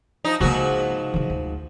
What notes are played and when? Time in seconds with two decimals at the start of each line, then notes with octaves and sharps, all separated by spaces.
0.25 F3 D#4
0.40 G#2 C#3 F3 A#3 F#4
1.14 C#3 E3
1.30 D2